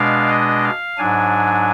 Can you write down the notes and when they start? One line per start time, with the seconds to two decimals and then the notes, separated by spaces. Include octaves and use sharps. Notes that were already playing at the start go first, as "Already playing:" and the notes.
Already playing: B2 G#3 D4 F5
0.29 D#5
0.64 F5
0.98 G#2 F#3 D4 G#5